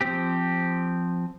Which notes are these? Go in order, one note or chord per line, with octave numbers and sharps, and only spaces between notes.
F3 C4 G4